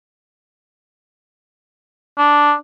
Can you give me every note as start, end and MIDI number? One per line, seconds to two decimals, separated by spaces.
2.18 2.54 62